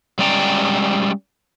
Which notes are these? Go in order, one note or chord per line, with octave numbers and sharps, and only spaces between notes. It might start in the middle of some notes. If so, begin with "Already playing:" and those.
G3 G#3 C#4 D5 G5 A#5